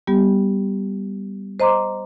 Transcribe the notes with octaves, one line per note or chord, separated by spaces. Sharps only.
G3 B3 G4
C5 D#5 A#5 C6 D6